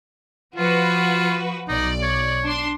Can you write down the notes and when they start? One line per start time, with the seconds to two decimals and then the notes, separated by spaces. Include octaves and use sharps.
0.56 F3 F4 F#4 B4
1.69 B1 D#4 D5
2.02 C#5
2.44 D4 C6